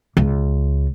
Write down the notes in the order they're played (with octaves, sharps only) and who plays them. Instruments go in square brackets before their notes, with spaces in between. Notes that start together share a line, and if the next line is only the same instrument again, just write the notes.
[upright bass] C#2